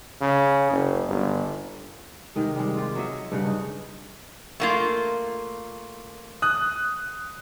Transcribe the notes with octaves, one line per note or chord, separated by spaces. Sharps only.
C#3
F#1
G1
C3 D#3 G#3
G3 G#3
F4 G4
F#3 C#5 D#5 E5
G2 C#3 F#5
D#4
A3 A#3 F4
D#6 F#6